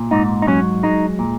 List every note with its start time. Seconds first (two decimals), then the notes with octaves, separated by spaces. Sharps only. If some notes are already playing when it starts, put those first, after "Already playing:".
Already playing: A#2
0.11 G#2 D#4
0.42 D#4
0.47 F#3 C#4
0.83 G#3 D#4
1.19 A#2